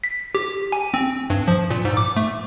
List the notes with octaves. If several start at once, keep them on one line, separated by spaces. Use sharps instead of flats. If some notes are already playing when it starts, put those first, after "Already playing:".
B6
G4
G#5
C4
G2
F3
A#2
G#2
D6
A3